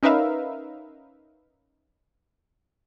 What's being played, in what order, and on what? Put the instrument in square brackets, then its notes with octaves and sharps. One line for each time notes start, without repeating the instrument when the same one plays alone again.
[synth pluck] C#4 D#4 A#4 B4 E5 F5